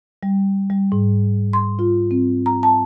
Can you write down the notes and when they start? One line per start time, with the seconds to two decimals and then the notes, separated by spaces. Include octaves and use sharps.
0.23 G3
0.70 G3
0.92 G#2
1.53 C6
1.79 F4
2.11 C4
2.46 A#5
2.63 A5